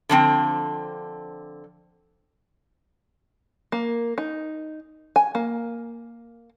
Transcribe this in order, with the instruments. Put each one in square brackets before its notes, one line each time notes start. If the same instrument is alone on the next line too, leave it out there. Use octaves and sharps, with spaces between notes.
[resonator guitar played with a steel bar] D3 F3 C4
[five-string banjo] A#3
D#4
G#5
A#3